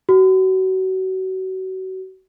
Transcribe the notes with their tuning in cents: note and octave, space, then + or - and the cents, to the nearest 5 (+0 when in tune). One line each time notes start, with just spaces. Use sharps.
F#4 +30